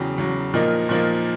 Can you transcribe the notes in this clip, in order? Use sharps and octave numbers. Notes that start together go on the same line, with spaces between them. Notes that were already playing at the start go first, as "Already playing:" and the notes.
Already playing: E2 C#3 F#3 G5
E2 C#3 F#3
A#2 F3 A#3 D#4
A#2 F3 A#3 D#4